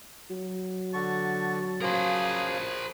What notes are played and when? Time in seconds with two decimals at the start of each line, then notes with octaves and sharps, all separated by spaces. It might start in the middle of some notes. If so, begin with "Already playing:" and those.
0.30 F#3
0.94 D3 F#4 A5 C#6
1.81 C#3 F3 A#3 G#4 A#4 C5